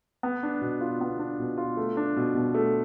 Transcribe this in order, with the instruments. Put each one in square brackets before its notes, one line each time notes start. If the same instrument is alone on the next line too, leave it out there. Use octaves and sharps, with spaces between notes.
[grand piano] B3
D4
B2
F4
B3
D4
B2
F4
A3
D4
B2
B2
A3